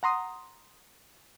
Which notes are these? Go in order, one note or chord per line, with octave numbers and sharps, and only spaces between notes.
F#5 A#5 C6 D#6